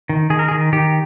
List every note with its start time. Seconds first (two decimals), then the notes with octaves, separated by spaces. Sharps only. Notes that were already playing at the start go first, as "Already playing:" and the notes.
0.09 D#3
0.30 D#3 G#4
0.39 A#4
0.48 G#4
0.51 D#3
0.73 D#3 G4